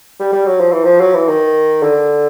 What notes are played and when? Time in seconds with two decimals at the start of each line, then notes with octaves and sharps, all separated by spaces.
0.20 G3
0.33 G3
0.46 F#3
0.60 F3
0.72 E3
0.85 F3
1.01 F#3
1.14 E3
1.28 D#3
1.82 D3